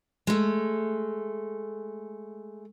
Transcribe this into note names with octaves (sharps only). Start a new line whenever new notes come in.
G#3 A3